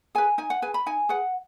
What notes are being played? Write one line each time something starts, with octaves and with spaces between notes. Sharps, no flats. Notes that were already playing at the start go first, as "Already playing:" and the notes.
G#4 B4 G#5
D#4 G#5
F#5
G#4 B4 G#5
B5
D#4 G#5
G#4 B4 F#5